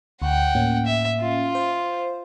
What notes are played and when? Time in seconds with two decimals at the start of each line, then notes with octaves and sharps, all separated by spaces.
0.22 D2 F#5 G5
0.55 A2 A#3 C#4
0.86 E5
1.21 F4
1.55 C5